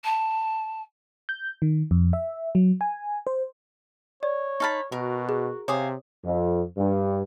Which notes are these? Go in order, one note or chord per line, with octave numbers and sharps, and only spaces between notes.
A5
G6
D#3
F2
E5
F#3
G#5
C5
C#5 D5
D#4 A5 B5 C#6 F6 A6
B2 F#4 A#4
G#4
C3 C5 C#5 F5 G#5 D6 D#6
F2
G2